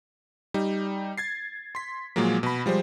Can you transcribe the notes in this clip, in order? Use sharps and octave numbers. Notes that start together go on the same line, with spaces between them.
G3 D#4
G#6 A6 C7
C6 B6
A#2 F3 F#3 G#3 A#3
B2 B5
F3 G3 G#3 C5